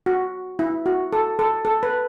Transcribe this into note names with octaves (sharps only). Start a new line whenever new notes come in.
F#4
E4
F#4
A4
A4
A4
B4